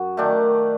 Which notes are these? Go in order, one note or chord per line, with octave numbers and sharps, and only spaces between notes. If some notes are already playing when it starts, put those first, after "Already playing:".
Already playing: F#2 F#4
D#3 A3 D4